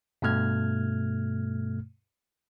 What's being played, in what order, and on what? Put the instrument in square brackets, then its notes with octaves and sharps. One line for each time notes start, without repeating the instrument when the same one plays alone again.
[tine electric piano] G2 B2 A3 F6 G#6